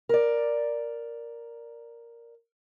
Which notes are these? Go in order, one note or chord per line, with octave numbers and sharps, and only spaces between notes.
A#4 D5